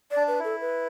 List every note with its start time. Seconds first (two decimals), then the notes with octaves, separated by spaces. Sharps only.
0.11 D5
0.17 D4
0.28 B4
0.39 E4 A4
0.61 B4